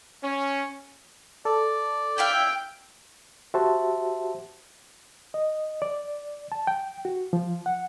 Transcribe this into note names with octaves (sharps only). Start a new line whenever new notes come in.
C#4
A4 D5
E4 E5 F5 G5
F#4 G4 C5 E5 F#5 A5
D#5
D5
A5
G5
F#4
F3
F#5